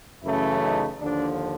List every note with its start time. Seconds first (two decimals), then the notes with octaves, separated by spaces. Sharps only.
0.23 F#2 C#3 E3 A3 E4
0.62 D#4
1.00 D#2 D3 F3 D4